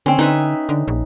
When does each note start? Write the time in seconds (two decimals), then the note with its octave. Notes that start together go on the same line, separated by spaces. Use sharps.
0.06 D3 C4 C#4
0.19 D3 D#4 B4 E5
0.69 D3
0.88 A#1